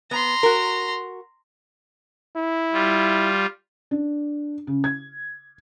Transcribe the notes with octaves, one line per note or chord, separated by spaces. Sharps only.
B3 A#5 C6
F#4 A#4
E4
G3 F4
D4
C#3
G#6